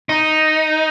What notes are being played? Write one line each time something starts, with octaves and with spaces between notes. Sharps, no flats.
D#4